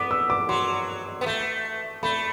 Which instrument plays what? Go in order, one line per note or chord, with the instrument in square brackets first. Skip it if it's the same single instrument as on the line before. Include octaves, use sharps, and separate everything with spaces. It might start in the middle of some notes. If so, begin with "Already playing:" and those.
Already playing: [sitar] B3 [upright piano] D6
[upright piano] E6
D6
[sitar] F#3 [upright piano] C6
[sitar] B3
A3
[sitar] A3 [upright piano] B5